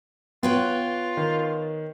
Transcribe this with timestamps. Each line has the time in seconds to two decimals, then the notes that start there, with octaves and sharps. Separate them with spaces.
0.43 B3 F4 B4 C#5 G5
1.17 D#3